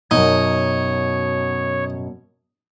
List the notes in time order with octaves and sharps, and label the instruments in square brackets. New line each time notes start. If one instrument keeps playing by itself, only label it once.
[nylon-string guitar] F#2 B2 [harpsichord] D#4 [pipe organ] C#5